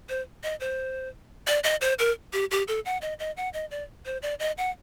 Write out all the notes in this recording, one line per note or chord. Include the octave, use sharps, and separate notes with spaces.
C5
D#5
C5
D5
D#5
C5
A#4
G4
G4
A4
F#5
D#5
D#5
F#5
D#5
D5
C5
D5
D#5
F#5